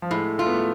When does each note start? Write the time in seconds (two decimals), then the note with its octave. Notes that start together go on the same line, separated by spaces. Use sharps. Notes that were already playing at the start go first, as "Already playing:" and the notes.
0.02 F3
0.10 A2 G#3
0.38 A3 F4
0.46 B3
0.54 A3